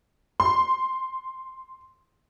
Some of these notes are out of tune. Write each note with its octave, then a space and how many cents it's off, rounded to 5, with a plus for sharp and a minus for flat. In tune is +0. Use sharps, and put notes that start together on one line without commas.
C6 +0